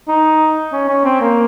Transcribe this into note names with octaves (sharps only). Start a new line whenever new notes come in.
D#4
C#4
C#4
C4
A#3